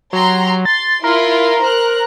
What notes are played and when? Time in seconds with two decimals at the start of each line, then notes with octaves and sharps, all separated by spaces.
0.13 F#3 G4 A#5 C6
0.65 C6 A6
1.04 E4 F4 A#4 C6
1.62 C5 A#5 F#6